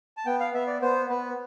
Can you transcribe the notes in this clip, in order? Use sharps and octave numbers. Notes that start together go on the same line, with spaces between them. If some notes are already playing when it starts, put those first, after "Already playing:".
A5
B3 G5
F5
B3 E5
D5
B3 C5
B3 B4